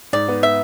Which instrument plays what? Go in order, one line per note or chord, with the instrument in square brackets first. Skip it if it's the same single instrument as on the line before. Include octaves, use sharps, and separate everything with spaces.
[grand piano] G#2 [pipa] D5
[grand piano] B3
[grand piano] B3 [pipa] E5